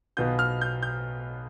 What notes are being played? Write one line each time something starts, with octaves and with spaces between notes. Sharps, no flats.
B1 B2 B3 F4 G6
F6
G6
G6